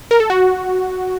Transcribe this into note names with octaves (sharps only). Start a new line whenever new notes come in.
A#4
A4
F#4